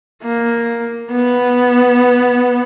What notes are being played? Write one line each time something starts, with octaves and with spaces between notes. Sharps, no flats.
A#3
B3